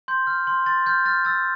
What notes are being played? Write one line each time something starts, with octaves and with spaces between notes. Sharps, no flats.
C6 G6
F6
C6
C6 A6
F6 G6
F6 A6
E6 A6